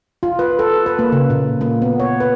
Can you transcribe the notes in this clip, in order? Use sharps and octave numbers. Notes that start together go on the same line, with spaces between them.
F4
B4
A4
B4
A#3
C#3
A#2
A#3
B3
C#5
B4